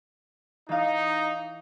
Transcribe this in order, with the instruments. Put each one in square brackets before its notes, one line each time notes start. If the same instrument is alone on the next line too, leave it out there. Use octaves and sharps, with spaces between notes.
[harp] E3 F5 [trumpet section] D#4